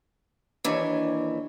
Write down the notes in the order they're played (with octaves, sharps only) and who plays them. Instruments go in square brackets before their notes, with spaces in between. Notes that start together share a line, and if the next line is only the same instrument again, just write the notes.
[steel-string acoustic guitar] D#2 E3 [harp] D4 C#5